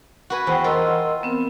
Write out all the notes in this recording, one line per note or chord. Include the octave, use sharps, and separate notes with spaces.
F#4 B4 G#5
E2 C5 F#5 G5
F4 A#4 D#5 C6 E6
B3 C4